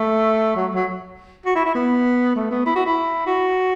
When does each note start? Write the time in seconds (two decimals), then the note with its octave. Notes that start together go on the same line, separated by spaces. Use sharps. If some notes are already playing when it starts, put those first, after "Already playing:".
Already playing: A3
0.56 F#3
0.75 F#3
1.46 F#4
1.56 E4
1.66 E4
1.75 B3
2.36 A3
2.51 B3
2.66 E4
2.75 F#4
2.86 E4
3.27 F#4